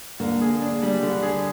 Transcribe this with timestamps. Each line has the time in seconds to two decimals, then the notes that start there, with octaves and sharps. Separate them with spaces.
0.20 D3 A#3
0.41 G#4
0.62 D4
0.83 G3
1.03 D3
1.23 G#4